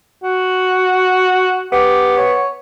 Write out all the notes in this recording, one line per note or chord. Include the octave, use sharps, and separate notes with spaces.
F#4
B3 G4
C#5